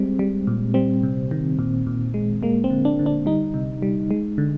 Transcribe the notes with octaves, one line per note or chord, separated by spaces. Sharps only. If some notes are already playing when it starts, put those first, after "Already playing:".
Already playing: G3 G#3 C4
G3
A#2
G3 C4
C3
D#3
A#2
A#2
G#3
G#3 A#3
C4
D3
D4
D3
D4
G3 D#4
C3
G3
G#3
D3